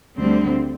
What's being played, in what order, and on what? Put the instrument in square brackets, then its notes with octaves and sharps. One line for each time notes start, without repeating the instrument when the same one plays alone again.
[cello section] D2 D3 G3 C4